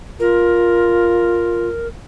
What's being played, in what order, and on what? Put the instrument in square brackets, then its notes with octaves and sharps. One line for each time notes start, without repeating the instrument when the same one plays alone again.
[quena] F4 [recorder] A#4